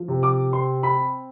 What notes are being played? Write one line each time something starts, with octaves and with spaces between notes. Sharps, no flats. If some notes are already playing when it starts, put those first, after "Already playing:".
Already playing: F3
C3
D6
C4 C6
B5